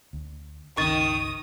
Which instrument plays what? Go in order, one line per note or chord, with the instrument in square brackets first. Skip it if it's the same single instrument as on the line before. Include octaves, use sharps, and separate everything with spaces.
[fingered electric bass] D2
[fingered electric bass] G1 C#2 C#4 [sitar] D#3 [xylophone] C#6 A6 [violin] D#6